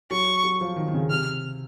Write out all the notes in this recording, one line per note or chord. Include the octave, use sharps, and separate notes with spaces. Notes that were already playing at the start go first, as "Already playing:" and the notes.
F#3 C#6
F#3
F3
D#3
D#3
C#3
C3 F6